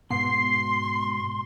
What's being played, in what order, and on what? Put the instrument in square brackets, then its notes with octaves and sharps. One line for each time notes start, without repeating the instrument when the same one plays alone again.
[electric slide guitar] G#2 B2 [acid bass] B3 [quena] C6 [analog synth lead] C7